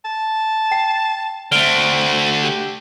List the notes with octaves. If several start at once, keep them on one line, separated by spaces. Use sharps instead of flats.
A5
G5 C7
D3 A3 C4 F6 D7 G7
G4